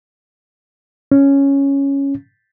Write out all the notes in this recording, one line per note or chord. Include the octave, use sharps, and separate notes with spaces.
C#4